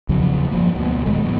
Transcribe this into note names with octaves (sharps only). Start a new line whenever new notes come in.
E2 C#3 F3 F#3
G1 F3 A#3
D2 B2
A#2 D#3 G#3 A3
F2 A2 B3